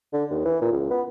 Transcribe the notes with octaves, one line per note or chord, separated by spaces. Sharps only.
D3
D#2
E3
A#2
C#2
B3